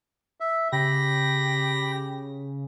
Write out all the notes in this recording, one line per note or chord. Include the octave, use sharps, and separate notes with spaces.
E5
C#3 G4 G5 B5 A#6